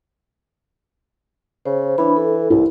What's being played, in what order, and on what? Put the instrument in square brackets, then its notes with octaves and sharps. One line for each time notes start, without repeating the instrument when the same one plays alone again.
[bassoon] C#3 [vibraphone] C5
[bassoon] E3 [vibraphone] D4 B5
[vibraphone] A4
[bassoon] C2 [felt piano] E4